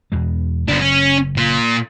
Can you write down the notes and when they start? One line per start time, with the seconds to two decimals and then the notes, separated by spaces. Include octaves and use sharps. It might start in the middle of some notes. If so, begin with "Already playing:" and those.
0.12 E2 B2 G#3
0.69 F#1 F#2 B3 D4
0.81 C#4
1.36 A#2 F4